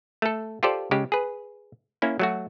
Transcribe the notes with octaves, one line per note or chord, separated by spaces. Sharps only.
A3 A4
F4 G4 A4 C5 D5
C#3 G#3 G4
G#4 B4
A#3 C#4 E4
F#3 A3 F#4